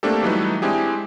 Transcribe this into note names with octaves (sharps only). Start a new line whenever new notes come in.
A3 A#3 C4 D4 G4 A4
E3 F#3 G3 A3 D#4 B4
G#3 C4 D4 E4 G4 G#4